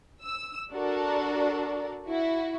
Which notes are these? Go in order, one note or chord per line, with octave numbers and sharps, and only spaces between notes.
E6
D4 F#4 A4 A#4 D5
E4 F#4